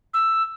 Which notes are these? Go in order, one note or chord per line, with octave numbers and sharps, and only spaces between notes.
E6